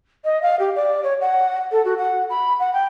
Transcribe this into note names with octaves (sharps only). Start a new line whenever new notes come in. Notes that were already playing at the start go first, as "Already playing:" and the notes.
D#5
F5
G4
D5
C#5
F#5
A4
F#4
F#5
B5
F#5
G5